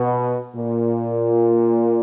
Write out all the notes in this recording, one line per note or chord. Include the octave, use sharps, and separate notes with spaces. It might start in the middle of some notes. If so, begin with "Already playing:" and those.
Already playing: B2
A#2